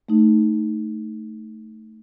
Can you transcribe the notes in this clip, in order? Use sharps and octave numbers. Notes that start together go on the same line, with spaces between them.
A3 D#4